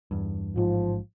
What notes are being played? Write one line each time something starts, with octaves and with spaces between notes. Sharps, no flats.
E2 G2
A1 G#2 F3